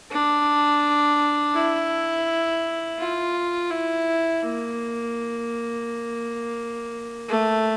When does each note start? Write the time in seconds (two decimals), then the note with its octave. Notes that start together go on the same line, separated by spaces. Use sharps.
0.11 D4
1.54 E4
2.99 F4
3.71 E4
4.42 A#3
7.29 A3